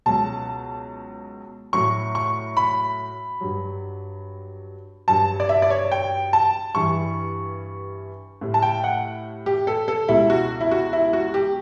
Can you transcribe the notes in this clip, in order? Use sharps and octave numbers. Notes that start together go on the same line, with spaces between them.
C#2 B2 F#3 A5
A2 F#3 C#6
C#6
B5
G2 F#3
G2 F#3 A5
D5
E5
D5
C#5
G5
A5
G2 E3 G3 C#6
A2 G3
A5
G5
F#5
G4
A4
A4
C#2 B2 G3 E4
F#4
E4
F#4
E4
F#4
G4